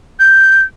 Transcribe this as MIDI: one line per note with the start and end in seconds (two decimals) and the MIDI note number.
0.20 0.63 91